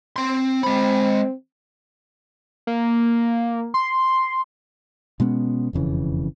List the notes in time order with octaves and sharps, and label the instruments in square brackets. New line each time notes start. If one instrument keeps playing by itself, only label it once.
[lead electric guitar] C4 C6
[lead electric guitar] G#3 B5 [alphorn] C4
[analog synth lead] A#3
C6
[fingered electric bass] B2 G#3 B3 C#4
E1 F2 C#3 E3